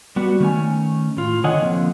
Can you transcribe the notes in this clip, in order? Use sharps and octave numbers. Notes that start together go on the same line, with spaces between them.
G3 B3 F#4
D#3 A3 C#4 G#5
A2 F4
D3 D#3 C#5 D#5 F#5 G#5
D3 F3 A#3 C4